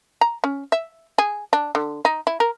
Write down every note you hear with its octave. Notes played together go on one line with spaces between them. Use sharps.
A#5
C#4
E5
G#4
D4
D3
D#4
E4
A#4